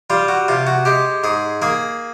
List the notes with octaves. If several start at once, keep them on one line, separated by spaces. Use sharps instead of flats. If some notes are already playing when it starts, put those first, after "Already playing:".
G3 F4
F#4
C3 F4
F#4
G#3 G4
G#2 G#4
A#3 G#4